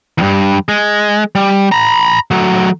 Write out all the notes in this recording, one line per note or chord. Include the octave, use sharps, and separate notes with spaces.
E2 G2
G#3
G3
A#5 B5
F#3 A3